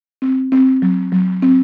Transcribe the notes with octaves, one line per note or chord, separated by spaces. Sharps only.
C4
C4
F#3
F#3
C4